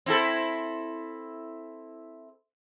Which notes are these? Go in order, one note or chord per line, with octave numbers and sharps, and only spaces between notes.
C4 E4 A4